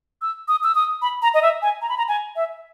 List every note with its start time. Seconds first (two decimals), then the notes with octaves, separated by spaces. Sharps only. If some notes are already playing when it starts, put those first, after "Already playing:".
0.22 E6
0.48 D#6
0.64 E6
0.75 D#6
1.02 B5
1.22 A#5
1.34 D#5
1.42 E5
1.62 G#5
1.82 A#5
1.89 B5
1.98 A#5
2.08 G#5
2.36 E5